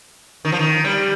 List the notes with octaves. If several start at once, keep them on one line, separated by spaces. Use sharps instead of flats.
D#3
F3
D#3
G3